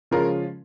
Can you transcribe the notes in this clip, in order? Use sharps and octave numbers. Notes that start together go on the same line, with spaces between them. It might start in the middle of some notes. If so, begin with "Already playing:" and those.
C#3 F3 G#3 C#4 F4 A#4